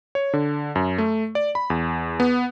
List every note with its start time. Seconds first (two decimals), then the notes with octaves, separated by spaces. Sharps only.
0.15 C#5
0.33 D3
0.76 F#2
0.98 A3
1.35 D5
1.55 B5
1.70 E2
2.20 B3